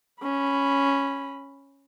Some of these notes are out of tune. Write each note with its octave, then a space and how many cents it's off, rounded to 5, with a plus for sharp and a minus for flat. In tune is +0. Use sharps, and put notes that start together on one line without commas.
C#4 +0 B5 +0